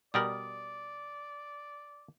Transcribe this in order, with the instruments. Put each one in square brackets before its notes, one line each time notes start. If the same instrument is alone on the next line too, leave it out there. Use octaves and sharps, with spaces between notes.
[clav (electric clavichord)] B2 G3 A#4 [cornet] D5 [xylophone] D#6 D7 F#7